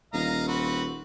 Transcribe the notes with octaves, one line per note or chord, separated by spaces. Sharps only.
D#1 D#5 F5 A#5
C4 F#4 B4